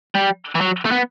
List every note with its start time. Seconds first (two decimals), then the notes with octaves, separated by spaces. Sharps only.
0.15 G3
0.55 E3
0.61 F#3
0.85 A3
0.91 B3